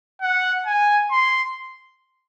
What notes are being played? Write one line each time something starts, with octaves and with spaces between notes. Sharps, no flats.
F#5
G#5
C6